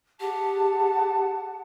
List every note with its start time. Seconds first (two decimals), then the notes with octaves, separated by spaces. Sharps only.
0.20 G4 G#4 F#5 A5